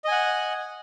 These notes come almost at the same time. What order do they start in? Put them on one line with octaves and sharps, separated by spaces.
D#5 G#5 F#5